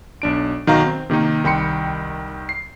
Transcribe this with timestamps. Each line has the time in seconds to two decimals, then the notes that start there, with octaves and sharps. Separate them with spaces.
0.22 B1 D4 D7
0.67 B1 D#3 D#4 F#4 F5 A#5
0.86 C4
1.10 C3 D#3 A#3 D#4
1.44 C2 D#3 G5 B5 C6 C#7
2.49 C7